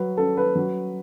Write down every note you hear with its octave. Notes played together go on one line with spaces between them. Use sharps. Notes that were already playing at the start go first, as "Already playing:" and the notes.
Already playing: F#3 B4
C#4 A4
B4
F#3